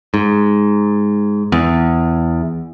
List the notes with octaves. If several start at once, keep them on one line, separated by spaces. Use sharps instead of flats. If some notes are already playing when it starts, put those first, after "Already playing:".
G#2
E2